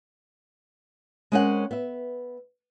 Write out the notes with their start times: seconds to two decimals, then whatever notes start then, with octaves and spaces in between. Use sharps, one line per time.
1.32 G#3 C4 C#4 A#4 E5 F#5
1.71 B3 E5